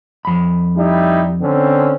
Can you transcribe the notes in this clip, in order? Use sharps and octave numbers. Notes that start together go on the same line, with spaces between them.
F2 B5
G3 D#4 E4
D3 C4 C#4